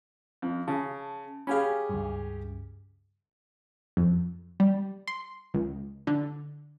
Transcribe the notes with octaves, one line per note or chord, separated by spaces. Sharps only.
F2
C#3 A5
C#4 G4 G#4 F5 G#5 B5
C#2 G2
F2
G3
C6
C#2
D3